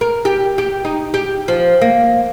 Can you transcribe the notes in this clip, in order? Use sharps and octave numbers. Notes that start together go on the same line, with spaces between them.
A#4
G4
G4
D#4
G4
F3
A#3